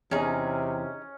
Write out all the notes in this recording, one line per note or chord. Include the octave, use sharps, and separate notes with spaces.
E2 C3 C#4 D#4 G#4